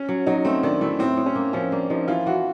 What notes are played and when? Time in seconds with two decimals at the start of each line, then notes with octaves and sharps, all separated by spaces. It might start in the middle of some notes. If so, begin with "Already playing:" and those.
Already playing: C#4
0.09 F#3
0.27 F#3 D#4
0.45 A3 C4
0.63 D#3 D4
0.81 A3 E4
0.99 A2 C4
1.17 A2
1.26 C#4
1.35 A#3
1.53 F3 C#4
1.72 A#3 D4
1.90 F3 D#4
2.08 E3 F4
2.26 E3 F#4